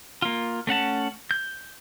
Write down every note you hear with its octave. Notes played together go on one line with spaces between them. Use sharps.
A#3 F4
A3 C#4 F#5 A5
G6